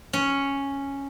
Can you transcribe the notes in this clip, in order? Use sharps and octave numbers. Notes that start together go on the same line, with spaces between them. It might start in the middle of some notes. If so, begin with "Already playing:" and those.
C#4